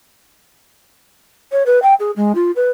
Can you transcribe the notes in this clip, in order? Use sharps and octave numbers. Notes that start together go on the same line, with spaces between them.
C#5
B4
G5
G#4
G#3
F4
B4